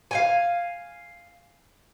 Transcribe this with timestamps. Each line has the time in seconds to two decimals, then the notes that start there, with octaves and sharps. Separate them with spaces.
0.11 F5 G5 G#5